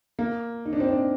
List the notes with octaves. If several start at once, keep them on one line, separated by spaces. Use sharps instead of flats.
A#3
D#4
D4
C4
D4